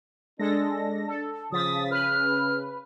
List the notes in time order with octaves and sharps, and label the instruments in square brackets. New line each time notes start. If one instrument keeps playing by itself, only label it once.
[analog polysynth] G#3 A4 A#6 [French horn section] D4
[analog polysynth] A4
[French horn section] C#3 [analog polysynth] F3 A6 B6 [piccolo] D#6
[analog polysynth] B4 [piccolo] F6